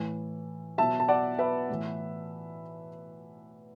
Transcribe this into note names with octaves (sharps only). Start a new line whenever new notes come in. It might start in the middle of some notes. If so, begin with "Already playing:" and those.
Already playing: A2 E3
B2 F#3 E5 A5
A5
D5 F#5
B4 E5
A2 E3